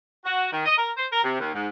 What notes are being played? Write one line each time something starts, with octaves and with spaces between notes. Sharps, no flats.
F#4
D#3
D#5
A#4
C5
A#4
C3
D#2
G#2